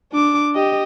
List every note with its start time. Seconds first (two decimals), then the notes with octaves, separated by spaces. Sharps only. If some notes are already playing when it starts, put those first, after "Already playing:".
0.12 D4 D6
0.55 G4 D#5